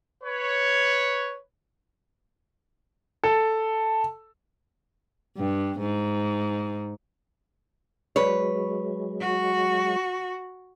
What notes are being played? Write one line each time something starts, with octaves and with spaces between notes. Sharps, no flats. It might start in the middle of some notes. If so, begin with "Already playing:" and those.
B4 C#5
A4
G2
G#2
F#3 G#3 B4 C#5
F#4